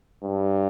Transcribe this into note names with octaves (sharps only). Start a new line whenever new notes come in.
G2